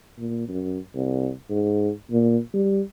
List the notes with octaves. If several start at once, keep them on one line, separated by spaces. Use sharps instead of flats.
A#2
F#2
C2
G#2
A#2
G3